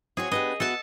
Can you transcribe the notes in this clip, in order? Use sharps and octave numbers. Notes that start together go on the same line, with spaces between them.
C4 F#4 G#4 C#5
B3 D4 G4 D#5
B3 F#4 A4 E5 A5